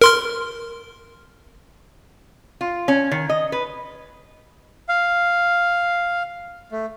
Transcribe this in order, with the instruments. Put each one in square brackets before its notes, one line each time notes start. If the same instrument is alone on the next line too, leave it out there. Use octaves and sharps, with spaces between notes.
[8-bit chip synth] A#4 C6 F6
[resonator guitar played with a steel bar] F4
C#4
D#3
D#5
B4
[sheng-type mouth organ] F5
A3